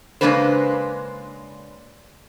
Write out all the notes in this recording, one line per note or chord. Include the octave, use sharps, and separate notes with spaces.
C#3 G#3 A#3 D4 B4 C5